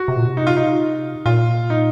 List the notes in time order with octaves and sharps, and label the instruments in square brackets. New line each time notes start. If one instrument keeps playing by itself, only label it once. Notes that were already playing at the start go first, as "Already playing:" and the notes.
Already playing: [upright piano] F#4
[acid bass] C3
A#2
C3
[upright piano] D#4
F4
D#4
[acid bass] A#2 [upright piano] F4
[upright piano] D#4